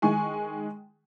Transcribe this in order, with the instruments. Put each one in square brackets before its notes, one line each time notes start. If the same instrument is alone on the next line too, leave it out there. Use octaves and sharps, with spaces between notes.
[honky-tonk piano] D#3 G#3 G#5 C#6